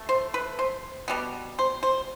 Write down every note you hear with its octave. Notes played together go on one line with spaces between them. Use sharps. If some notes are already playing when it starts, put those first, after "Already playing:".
Already playing: A3
C5
B4
C5
B2 G3 B3
C5
C5